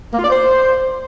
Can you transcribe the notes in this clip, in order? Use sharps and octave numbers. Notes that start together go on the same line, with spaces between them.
A#3
F4
D5
C5